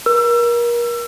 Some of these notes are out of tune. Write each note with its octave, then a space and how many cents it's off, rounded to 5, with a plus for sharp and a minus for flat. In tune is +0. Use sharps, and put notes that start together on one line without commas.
A#4 +30 E6 +30